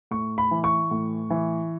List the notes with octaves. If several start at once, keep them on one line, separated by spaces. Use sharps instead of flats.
A2 C#6
B5
E3
C#6
A2
E3